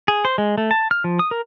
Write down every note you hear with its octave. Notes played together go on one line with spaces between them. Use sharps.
G#4
C5
G#3
A3
A5
F6
F3
D#6
A#4